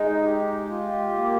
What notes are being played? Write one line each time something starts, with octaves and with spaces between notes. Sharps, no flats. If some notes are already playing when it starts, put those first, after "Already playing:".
Already playing: G#3 D#4
G4
F4
A#3